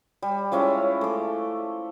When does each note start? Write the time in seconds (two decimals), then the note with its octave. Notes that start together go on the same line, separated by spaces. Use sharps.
0.22 G3
0.52 F3 G#3 C#4 E4
1.01 A3 D6